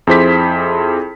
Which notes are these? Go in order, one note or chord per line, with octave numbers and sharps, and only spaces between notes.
F2 E4 G#4 C5 D6 B6